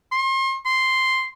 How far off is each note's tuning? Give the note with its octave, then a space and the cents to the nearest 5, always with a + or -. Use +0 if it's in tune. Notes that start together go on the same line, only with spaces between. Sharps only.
C6 +35
C6 +0